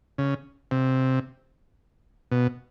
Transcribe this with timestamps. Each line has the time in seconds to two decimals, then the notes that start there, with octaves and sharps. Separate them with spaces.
0.18 C#3
0.71 C3
2.31 B2